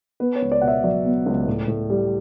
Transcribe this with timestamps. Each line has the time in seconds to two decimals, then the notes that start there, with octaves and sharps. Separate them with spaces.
0.20 B3 B4
0.36 C#5
0.42 C#2
0.52 D5
0.61 B2 F#5
0.68 E5
0.84 F#3 D5
1.05 B3
1.26 C#2
1.47 A2
1.68 A2
1.90 G3